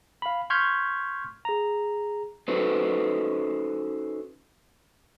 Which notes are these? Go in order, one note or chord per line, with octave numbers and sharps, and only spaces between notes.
F5 B5
C6 C#6 F6 G6 G#6 B6
G#4 A#5
C#4 D#4 F#4 A4 B4 C5